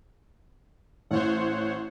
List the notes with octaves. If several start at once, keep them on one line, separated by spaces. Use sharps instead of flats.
A1 C5 C#5 F#5